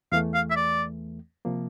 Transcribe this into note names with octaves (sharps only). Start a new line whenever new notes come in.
E2 E3 A3 F5
F5
E5
D5
C3 F3 A#3